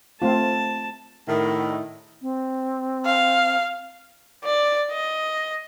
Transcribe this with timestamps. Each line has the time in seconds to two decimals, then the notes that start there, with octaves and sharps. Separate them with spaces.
0.22 A3 C4 F4 A5
1.29 A2 D#3 E4
2.22 C4
3.05 F5
4.44 D5
4.91 D#5